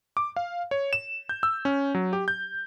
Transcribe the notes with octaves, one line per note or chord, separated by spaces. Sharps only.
D6
F5
C#5
E7
G6
E6
C#4
F#3
G4
G6